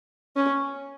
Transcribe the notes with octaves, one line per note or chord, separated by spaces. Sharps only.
C#4